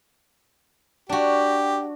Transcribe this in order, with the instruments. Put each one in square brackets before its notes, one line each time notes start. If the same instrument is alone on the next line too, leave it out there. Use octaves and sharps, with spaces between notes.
[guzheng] D4 F#4 [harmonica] G4